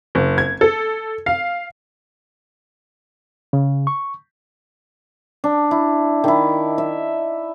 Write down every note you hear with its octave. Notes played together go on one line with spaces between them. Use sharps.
F#1
G#6
A4
F5
C#3
C#6
D4
E4
D#3 E4
E5